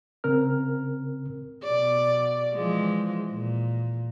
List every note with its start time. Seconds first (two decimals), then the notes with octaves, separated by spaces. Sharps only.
0.24 C#3 C4 A#4 F6
1.63 B2 D5
2.54 E3 F3 G#3
3.30 A#2